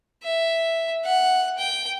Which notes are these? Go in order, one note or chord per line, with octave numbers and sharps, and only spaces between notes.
E5
F#5
G5